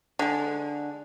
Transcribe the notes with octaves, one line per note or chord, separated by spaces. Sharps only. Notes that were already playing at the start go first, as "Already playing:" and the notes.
D3 G#3